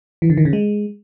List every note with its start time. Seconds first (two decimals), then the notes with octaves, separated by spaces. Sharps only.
0.22 E3
0.30 D3
0.38 D#3
0.45 C#3
0.53 G#3